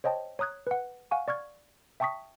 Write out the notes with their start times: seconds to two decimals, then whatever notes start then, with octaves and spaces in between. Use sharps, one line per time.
0.04 C5 C#5 D#5 G5 A5
0.39 C#5 A#5 D#6 F#6 G#6
0.67 B4 F#5
1.11 F5 F#5 G#5 C#6
1.28 D5 C#6 F6 G#6
2.00 E5 G5 A5 C#6 D#6 B6